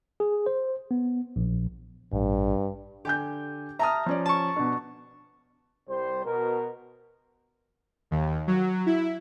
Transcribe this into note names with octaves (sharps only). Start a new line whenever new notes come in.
G#4
C5
B3
A#1
A1 G2
D3 G4 G#5 G6
E5 A5 A#5 D#6 F6
F3 C#4 D5
A5 C#6
B2 D4
C2 G3 C5
B2 A#4
D#2
F#3
E4